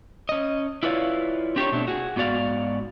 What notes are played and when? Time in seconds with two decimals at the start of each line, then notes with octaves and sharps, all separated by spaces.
0.29 C#4 D#5
0.83 E4 F4 B4 C#5 D5 F5
1.56 C4 D4 G4 A4 A#4 C#5
1.72 B2 A3 C4 D4
1.88 F#4 G#4
2.16 G#2 B3 F#4 D5 F5